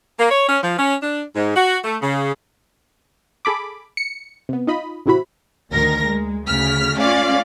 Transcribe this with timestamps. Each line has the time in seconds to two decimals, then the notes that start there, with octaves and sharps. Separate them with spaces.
0.18 A#3
0.30 C#5
0.48 C#4
0.62 F3
0.77 C#4
1.01 D4
1.35 G#2
1.55 F#4
1.83 A3
2.01 C#3
3.45 G#4 A4 B5 D6
3.97 C#7
4.49 C3 B3
4.67 D#4 F4 D#5 B5
5.06 A1 C3 C4 E4 F#4 B5
5.70 D2 D#3 A#4 A#6
6.01 G#3
6.48 D2 C#3 F6 B6
6.96 A3 C#4 F4 D5 F5